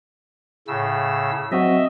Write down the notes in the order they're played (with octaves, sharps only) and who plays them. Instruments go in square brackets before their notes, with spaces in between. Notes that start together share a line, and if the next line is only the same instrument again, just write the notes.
[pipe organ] A2 C#3 E6
[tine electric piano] F#3 C4 F#4 [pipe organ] D#5 E5